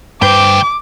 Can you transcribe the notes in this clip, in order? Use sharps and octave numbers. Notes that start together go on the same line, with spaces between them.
D2 G2 B4 C5 G5 D6